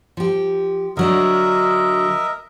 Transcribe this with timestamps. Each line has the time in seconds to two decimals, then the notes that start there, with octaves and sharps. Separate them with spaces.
0.17 F3 G4
0.97 D3 F#3 D4 A#4 D#5 E5